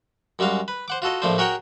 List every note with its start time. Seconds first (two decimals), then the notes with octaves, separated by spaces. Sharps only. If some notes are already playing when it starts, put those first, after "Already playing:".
0.39 F#2 G3 G#3 F#4 F5
0.68 B4
0.88 C5 F#5 D6
1.02 F4 F#4 A4 D#5
1.22 A#1 A2 F3 A3 D4 C5
1.38 F#4 G#4 A#4 C#5 F#5 G5